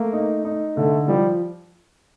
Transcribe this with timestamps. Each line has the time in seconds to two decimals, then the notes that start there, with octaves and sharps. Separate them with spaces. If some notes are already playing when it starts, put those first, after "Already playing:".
Already playing: A3 A#3
0.13 D#4
0.44 D#4
0.77 D3 A3
1.08 F3 G3